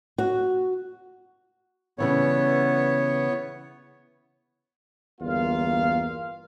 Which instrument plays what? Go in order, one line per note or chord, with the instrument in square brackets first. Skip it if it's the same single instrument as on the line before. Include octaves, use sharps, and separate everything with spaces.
[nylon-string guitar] F#4
[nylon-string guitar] C#3 E3 G3 [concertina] B3 C#5
[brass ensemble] G1 E2 A#3 F4 F5